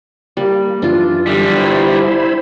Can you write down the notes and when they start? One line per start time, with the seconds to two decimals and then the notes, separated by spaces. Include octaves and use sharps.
0.37 G3 A#3
0.82 F#2 E3 D4 F4
1.27 D3 G3
1.57 E4 C5 B5